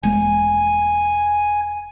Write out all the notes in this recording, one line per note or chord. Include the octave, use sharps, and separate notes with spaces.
E1 G#3 A#3 G#5